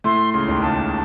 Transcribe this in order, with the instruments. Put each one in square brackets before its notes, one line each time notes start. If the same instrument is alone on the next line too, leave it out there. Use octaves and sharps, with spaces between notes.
[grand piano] A2 A3 [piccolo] C6
[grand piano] C#2 C#3 [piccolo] C6
[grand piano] D#2 D#3
[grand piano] C#2 C#3 [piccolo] A5